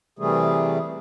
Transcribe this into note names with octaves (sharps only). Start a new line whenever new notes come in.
C3 E3 G3 A3 G#4